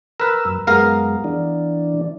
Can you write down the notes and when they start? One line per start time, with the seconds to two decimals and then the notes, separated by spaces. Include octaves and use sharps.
0.20 A#4 B4 E6
0.45 F#2
0.67 F#2 G#3 B3 A#4 F5
1.24 E3 D4